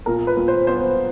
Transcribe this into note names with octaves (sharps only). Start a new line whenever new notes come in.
A#2 A#4
B4
A#2
C5
B3 C5